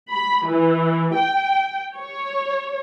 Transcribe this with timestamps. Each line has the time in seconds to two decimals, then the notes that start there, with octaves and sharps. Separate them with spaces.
0.11 B5
0.48 E3
1.14 G5
1.96 C#5